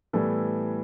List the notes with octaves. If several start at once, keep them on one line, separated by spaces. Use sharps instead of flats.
A2 E3 G3 B3 A4